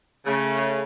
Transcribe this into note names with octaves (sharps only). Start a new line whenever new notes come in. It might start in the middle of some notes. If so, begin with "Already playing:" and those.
C#3 A3